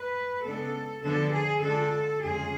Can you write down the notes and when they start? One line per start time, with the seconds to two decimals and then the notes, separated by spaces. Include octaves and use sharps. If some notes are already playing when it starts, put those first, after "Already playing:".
Already playing: B4
0.44 C#3 G#3 B3 D4 A4
1.03 D3 F3 B3 D4 A4
1.33 G#4
1.63 D3 G#3 D4 F4 A4
2.22 F2 C#3 G#3 C#4 F4 G#4